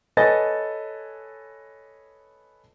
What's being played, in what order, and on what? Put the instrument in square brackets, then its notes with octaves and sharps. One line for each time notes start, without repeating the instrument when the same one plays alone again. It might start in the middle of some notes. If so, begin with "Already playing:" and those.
[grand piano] A4 B4 C#5 D#5 G#5 A6